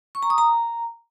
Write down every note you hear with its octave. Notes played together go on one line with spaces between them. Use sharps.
C#6
A#5
D#6
A#5